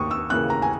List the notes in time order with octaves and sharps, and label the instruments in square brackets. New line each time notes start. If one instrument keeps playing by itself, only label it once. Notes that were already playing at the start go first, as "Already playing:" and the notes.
Already playing: [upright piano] D#2 [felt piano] C#6 D#6
[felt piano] E6
[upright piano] C#3 E3 A#3 [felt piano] F#6
[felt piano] A#5
G#5